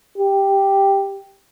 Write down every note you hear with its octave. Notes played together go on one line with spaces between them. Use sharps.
G4